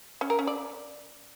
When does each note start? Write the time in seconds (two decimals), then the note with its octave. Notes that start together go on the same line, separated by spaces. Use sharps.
0.21 C#4
0.30 A#4
0.39 C#4
0.47 D5